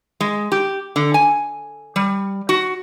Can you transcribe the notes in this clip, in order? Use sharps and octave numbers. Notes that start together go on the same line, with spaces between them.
G#3
G4
D3
G#5
G3
F#4